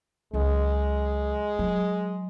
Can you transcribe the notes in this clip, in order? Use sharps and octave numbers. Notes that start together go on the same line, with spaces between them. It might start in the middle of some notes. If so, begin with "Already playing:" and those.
C#2 F#3 G#3
F#3